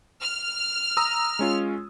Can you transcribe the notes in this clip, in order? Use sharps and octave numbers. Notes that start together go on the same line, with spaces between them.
F6
A#5 D#6 E6
G#3 C#4 F4